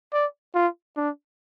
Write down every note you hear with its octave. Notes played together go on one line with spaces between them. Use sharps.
D5
F4
D4